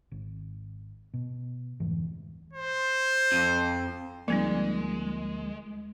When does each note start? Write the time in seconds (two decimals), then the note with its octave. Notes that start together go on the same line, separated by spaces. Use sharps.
0.11 G#1
1.14 B2
1.80 F1 D2 G#2 E3
2.53 C5
3.32 F2
4.28 D2 F3 G3 G#3 A#3 C4 D#4